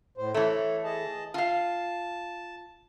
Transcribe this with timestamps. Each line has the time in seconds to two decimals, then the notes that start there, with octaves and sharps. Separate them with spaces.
0.18 A2 C5
0.34 E3 A3 A4 C#5
0.84 G#4 D#5 A5
1.34 F4 F5 A5